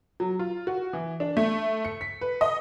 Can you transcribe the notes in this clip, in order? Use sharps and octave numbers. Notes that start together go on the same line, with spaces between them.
F#3
F4
F#4
E3
D4
A3
C#7
B6
B4
D#5